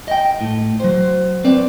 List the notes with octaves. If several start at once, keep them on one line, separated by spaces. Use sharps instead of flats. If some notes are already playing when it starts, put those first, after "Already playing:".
D#5 G5
A2
F#3 C5
C4 B4 D5